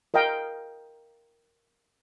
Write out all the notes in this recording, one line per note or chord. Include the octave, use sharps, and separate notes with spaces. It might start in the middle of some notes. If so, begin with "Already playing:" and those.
A#4 D#5 F5 G5